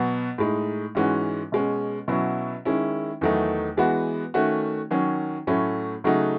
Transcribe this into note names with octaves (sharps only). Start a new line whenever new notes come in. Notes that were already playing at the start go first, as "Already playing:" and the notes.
Already playing: B2 F#3 B3
A2 G#3 D#4
G#2 E3 G#3 C#4 F#4
B2 G#3 C#4
B2 F#3 C#4 E4
D#3 G#3 C#4 E4
E2 D#3 F#3 A3 D#4
E3 G#3 B3 F#4
D#3 A3 C#4 F#4
D#3 F#3 C#4
A2 F#3 A3 C#4
C#3 F#3 A3 D#4 F#4